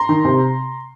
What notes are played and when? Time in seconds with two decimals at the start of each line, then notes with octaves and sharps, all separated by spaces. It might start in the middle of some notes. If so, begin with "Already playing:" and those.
Already playing: A#5 C6
0.09 D#3
0.25 C3